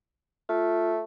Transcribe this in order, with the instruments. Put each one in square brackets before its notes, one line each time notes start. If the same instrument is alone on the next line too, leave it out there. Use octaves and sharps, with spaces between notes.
[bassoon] A3 [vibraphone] F4